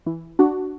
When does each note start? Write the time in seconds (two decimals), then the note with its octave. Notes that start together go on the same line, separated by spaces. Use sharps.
0.06 E3
0.39 D4 F#4